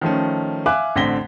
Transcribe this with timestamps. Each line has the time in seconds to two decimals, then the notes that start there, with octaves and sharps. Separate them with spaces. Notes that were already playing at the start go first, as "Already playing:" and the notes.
0.01 D#3 F3 A3 C#4
0.66 E5 F5 G#5 D6 F#6
0.96 A1 D3 C4 A#6 B6 G7